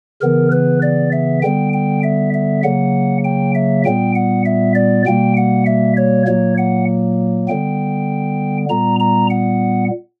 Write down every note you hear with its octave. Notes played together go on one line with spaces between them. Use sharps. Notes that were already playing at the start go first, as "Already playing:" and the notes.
C#3 E3 B3 A#4
B4
D5
E5
D3 G3 B3 G5
G5
E5
E5
C#3 F#3 A#3 F#5
G5
E5
A#2 G3 B3 G5
F#5
E5
D5
B2 G3 A#3 G5
F#5
E5
C#5
A#2 F#3 A#3 C#5
F#5
D3 G3 B3 G5
A#2 G3 B3 A#5
A#5
F#5